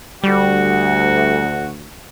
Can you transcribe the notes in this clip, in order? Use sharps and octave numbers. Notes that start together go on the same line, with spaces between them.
D2 G3 F#4